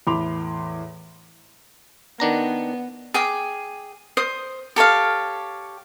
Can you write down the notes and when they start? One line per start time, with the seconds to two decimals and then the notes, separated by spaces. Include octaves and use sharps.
0.07 E2 A2 B5 C6 D6 F7
2.20 D#3 B3 D4 A#5
3.14 G#4 G5 D6
4.17 C5 D#6
4.76 G4 A4 C#5 F5